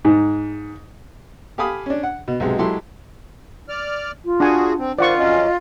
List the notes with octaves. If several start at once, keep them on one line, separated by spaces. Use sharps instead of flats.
G#2
G4 A4 F5 G#5 B5 D#6
C#4 D4
F#5
B2
B1 C3 G#3
F#3 G#3 E4 G4 A4 C6
D5 F6
F4
D4 F#4 G#4 F#5 G#5
C4
D#3 F4 C5 D5 F#5 C#6
F2 F#3 C#4 D#5